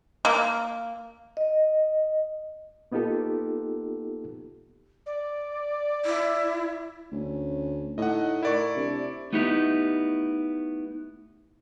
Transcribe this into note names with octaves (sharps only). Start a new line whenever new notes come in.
A#3
D#5
A#3 B3 D#4 F4 G4 A4
D5
E4
D2 C#4
A2 D#4 D#5 F#5
E4 A#4 D5 C#6
C3 D4
A3 B3 D#4 E4 G4